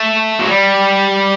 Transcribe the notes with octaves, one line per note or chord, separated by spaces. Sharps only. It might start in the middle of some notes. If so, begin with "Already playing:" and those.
Already playing: A3
F#3
G3